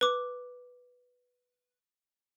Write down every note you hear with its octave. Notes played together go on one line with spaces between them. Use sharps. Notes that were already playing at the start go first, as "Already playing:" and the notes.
B4 D6